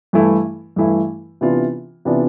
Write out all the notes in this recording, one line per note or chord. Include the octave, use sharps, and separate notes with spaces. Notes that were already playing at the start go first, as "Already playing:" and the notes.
G2 E3 A3 E4
G2 E3 A3 E4
C3 E3 B3 D4 F4
C3 E3 B3 D4 F4